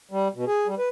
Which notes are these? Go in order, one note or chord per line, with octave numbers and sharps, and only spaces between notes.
G3
B2
G#4
G3
B4